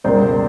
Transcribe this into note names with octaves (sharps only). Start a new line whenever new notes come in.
C#2 B2 G3 A#3 C5 D5